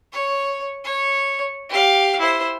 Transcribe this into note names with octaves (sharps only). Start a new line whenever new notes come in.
C#5
C#5
G4 F5
E4 C5